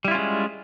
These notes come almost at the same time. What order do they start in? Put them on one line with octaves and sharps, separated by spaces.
G3 E4 F4 C#4 G#3